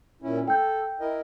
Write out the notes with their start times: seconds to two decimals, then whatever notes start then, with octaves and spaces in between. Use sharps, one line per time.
0.22 A#2 C#4 E4
0.48 A4 G5 G6
1.00 E4 A#4 D#5